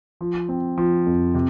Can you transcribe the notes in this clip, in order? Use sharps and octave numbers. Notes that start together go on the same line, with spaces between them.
F3
C4
F3
F2
C3